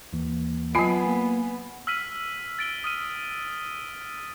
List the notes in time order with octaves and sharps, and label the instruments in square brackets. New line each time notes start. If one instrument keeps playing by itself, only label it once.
[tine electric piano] D#2 E3 A#3
[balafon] F#3 F4 [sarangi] B3 [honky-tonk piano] G#5 B5 C7 [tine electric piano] A5
[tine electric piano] A#3
[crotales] E6 F6 B6 D#7 F#7
A6 D7 G7
D#6 F6 D#7